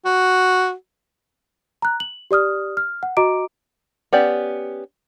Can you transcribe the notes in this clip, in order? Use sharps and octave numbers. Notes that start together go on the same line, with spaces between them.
F#4
A#5 F#6
F#7
G4 D5 D#6 F6
F6
F#5
F#4 D#5 A#5 D6 D7
B3 C#4 G4 D5